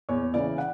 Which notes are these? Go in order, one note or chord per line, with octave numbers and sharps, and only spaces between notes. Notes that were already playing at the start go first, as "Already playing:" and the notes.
E2 C#5
C#3 E3 D5
F#5